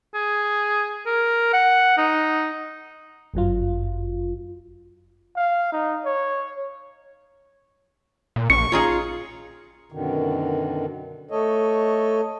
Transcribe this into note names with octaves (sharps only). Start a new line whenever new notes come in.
G#4
A#4
F#5
D#4
G1 F#2 F#3 F4
F5
D#4
C#5
A#2
A#1 C#6 C#7
C#4 D#4 F4 G#4
F#2 B2 D3 D#3
A3 A4 C#5 D#5